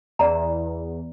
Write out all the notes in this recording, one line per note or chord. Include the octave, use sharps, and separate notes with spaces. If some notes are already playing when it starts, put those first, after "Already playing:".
E2 D5 A#5